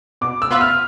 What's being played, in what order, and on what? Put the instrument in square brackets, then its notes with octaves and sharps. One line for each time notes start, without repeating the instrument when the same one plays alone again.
[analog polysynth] B2 [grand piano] D6
[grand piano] E6
[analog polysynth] B3 F4 B4 E5
[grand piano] F6